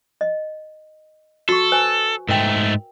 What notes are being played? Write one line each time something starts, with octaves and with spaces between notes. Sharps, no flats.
D#5
F#4 A4 C#6
B4 C5 G#5
G#2 A3 A#4 G5